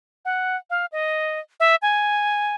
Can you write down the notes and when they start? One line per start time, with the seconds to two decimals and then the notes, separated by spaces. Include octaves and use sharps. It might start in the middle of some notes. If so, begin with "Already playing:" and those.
0.25 F#5
0.70 F5
0.92 D#5
1.60 E5
1.82 G#5